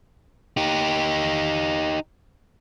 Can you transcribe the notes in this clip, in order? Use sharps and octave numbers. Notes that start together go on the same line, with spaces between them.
D#4 G4